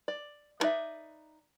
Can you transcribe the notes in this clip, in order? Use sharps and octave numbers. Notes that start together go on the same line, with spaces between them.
D5
B3 D#4 B4 D5 E5